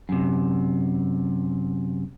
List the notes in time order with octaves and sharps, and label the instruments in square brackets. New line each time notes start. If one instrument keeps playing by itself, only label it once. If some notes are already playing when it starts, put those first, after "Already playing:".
[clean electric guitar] F#2 C3